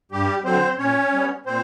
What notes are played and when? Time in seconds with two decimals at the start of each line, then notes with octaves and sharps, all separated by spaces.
0.11 G2 G3 G4
0.44 D3 F#3 C4 C5
0.78 A#2 C#4 C#5
1.13 G3 B3
1.46 A#2 C4 C5